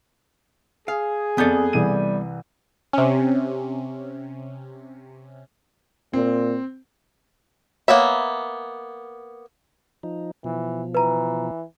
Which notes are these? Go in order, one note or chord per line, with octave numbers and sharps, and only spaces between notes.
G#4 F5
F2 B3 A4 D5 G6
C2 E3 G3 D#7
C3 C#4
A#2 C4
A#3 B3 C#5 E5
F3 D#4
B2 E3 F3
E3 B4 A#5